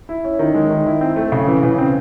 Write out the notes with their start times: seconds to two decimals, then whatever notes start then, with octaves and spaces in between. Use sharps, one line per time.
0.09 E4
0.24 C#4
0.39 D#3
0.54 G#3
0.70 D#3
0.86 E4
1.01 C4
1.16 A3
1.32 C#3
1.48 E3
1.63 C#3
1.78 C4